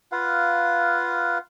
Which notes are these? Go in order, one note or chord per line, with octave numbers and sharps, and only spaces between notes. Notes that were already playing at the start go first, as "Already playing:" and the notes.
F4 B4 F5 F#5